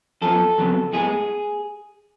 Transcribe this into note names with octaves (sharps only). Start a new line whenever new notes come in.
F#2 F3 B3 A4
F2 C#3 F#3 B3
A2 G#3 B3 G#4